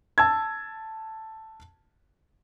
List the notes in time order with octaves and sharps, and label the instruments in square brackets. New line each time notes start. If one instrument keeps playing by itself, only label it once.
[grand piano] A5 E6 G#6